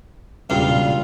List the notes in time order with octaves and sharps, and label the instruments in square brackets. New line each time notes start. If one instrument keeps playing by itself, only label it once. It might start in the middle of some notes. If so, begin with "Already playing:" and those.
[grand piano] E1 A#2 C#3 [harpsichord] G2 [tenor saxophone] F4